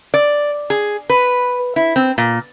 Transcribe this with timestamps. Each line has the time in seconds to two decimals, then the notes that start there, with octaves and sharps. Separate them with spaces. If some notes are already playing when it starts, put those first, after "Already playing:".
0.14 D5
0.70 G#4
1.10 B4
1.76 E4
1.96 C4
2.18 A#2